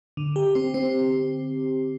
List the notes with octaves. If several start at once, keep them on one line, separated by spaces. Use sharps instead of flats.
D3
G4
C4
C4